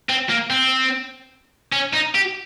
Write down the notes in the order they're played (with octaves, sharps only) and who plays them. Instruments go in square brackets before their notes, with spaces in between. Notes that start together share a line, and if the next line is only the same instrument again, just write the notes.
[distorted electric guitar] C4
A#3
C4
C#4
D#4
G4